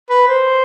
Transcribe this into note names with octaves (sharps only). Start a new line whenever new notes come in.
B4
C5